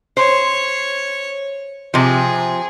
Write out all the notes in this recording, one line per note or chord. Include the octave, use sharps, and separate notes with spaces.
C5 C#5
C3 F3 G#4